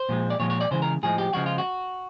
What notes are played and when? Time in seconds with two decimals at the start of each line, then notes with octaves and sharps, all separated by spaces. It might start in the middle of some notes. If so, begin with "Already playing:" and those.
Already playing: C5
0.09 A#2 F3 G#3
0.30 D5
0.40 A#2 F3 G#3 C#5
0.50 C#5
0.61 D5
0.71 C#3 E3 G#3 C5
0.82 A#4
1.03 A2 F3 G#3 G#4
1.18 G4
1.33 C#3 F3 G#3 F#4
1.46 F4
1.58 F#4